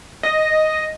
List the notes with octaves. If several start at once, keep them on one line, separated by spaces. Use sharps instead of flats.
D#5